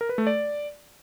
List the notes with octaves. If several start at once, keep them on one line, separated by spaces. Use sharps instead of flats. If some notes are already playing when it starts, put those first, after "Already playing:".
A#4
B4
A3
D5